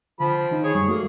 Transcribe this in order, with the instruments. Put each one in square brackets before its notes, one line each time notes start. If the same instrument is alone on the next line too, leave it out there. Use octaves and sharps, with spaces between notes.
[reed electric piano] D3 [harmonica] F3 C4 B5
[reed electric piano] D#3 D#4
[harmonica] G#4 C#5
[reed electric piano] F#2 G3
[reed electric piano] A3 F#4 A#4 [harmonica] A#3